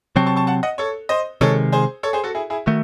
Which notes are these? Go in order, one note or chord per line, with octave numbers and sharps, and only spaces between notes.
C3 F#3 C4 A5 C#6
A5 C#6
A5 C#6
F#5 A5
D#5 F#5
A4 C#5
C5 D#5
C3 D#3 G#3 A4 C#5
G#4 C5
A4 C#5
G#4 C5
F#4 A4
E4 G#4
E4 G#4
D#3 A3 F#4